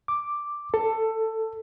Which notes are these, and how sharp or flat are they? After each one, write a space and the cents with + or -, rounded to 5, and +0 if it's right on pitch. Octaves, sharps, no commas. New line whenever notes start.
D6 +0
A4 +15